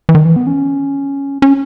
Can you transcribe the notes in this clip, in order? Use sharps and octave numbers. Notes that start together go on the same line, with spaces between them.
E3
D#3
E3
B3
C#4
C#4